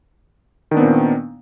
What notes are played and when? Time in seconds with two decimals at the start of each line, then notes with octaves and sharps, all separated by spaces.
0.71 D#3
0.74 D4
0.77 B3
0.80 C4
0.82 A#2